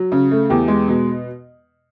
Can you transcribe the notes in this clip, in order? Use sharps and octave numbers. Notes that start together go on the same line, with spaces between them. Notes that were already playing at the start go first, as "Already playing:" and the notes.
Already playing: F#3
C#3
A3
E2 G4
G#3
B2